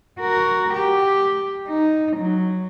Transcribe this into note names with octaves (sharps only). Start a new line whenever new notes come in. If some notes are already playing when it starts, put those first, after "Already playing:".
F#4 A#4
G4
D#4
F#3